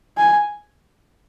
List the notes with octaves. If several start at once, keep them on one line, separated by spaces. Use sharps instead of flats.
G#5